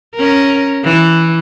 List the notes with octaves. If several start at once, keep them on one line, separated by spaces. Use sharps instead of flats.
C#4 A#4
E3